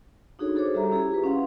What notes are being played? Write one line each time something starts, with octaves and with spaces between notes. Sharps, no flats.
D4 D#4 F#4 G#4 A4 C#5
F#4 G#4 A4 C5 C#5 D6
G3 G4 E5 A#5
C#4 E4 G4 G#4
F4 B4
C#4 F5 F#5 C6